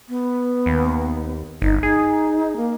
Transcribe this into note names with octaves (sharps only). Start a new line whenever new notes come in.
B3
D#2
G1 D#4
D#4 G#4
A#3